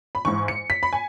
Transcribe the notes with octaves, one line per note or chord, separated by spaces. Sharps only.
B5
G#2 E3 C#6
C#7
B6
B5
G#5